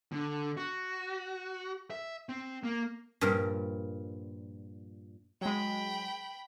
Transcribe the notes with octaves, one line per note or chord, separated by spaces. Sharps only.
D3
F#4
E5
C4
A#3
G2 A#2 F3 G3 A#4
F#3 G#3 G5 B5